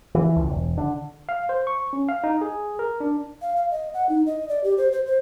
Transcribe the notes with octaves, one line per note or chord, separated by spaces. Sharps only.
E3
C#2
E1
D3
F5
C5
C#6
C#4
F5
D#4
G#4
A#4
D4
F5
F5
D#5
F#5
D#4
D#5
D5
G4
C5
C5
C5